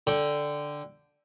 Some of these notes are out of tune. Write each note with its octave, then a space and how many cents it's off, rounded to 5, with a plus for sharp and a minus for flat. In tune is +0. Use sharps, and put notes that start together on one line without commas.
D3 +0 G5 +0